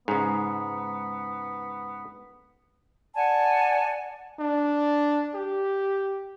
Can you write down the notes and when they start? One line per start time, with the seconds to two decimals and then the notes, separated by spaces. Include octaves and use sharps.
0.08 G#2 C#3 B3
3.15 D5 F#5 G#5 A5
4.40 D4
5.35 G4